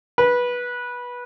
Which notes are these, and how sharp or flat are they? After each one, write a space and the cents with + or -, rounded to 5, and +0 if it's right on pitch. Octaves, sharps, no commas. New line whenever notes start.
B4 -15